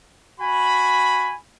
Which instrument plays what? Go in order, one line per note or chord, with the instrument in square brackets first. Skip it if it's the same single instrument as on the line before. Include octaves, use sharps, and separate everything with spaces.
[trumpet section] F#4 G#5 B5